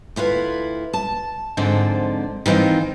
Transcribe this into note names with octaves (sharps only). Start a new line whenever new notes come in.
D2 E4 F4 B4
A5
G#2 D3 D#3 F3 C4 D5
D#3 E3 C4 D#4 F4